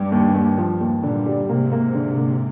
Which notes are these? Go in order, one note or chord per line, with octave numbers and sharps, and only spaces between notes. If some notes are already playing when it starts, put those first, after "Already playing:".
Already playing: G2
D#2
D#2
F3
D#2
G2 A#2 D3
G3
G#2 C3 A#3
A#3
D3
A#3